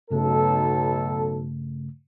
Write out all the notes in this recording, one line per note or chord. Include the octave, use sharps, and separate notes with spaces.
B1 G2 C#3 A3 A4